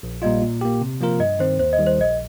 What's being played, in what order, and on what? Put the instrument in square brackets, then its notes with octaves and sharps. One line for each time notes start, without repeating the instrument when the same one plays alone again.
[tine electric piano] A#1
[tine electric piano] A#2 G3 A#3 F4 [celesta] D#5
[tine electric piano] A#2
A#3 G4
C3
F3 A#3 F4 A#4
[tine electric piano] G2 [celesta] D#5
[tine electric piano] D#3 C4 [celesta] C5
[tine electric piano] D#2 [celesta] C5
[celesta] D#5
[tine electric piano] D#3 G3
[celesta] C5
[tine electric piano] A#1 [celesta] D#5